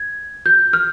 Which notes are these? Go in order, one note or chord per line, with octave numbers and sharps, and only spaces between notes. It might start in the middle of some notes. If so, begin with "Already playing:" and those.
Already playing: G#6
G6
F6